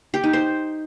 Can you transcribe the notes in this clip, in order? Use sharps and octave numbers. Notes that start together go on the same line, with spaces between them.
G4
D#4
C5